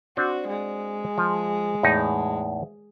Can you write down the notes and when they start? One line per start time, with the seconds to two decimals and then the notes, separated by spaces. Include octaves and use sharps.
0.17 C4 D4 F#4
0.48 G#3
1.18 F3
1.83 E2 A2 D#4